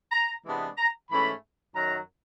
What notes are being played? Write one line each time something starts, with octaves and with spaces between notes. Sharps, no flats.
A#5
C3 E3 G#3 B3 D4
A#5
G#2 E3 A3 C#4 B5
F#2 D#3 F#3 A#5